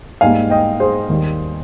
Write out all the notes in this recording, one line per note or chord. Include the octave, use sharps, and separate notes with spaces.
G#2 G3 A#3 F5 G#5
D#5 G5
G#4 C5
D#2 D#3 G3